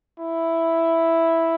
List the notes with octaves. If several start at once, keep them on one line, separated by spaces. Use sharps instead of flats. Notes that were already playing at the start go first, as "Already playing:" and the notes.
E4